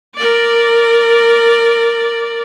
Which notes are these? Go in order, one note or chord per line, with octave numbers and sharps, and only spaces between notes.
A#4 D5